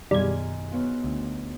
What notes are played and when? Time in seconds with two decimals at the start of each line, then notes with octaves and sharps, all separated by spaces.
0.11 F#2 B2 D#3 G3 D#4 F4 G#4 G#6
0.72 F#3 B3 F4
1.04 D2